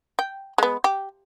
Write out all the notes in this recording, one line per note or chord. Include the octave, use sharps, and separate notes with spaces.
G5
G#3 B3
G4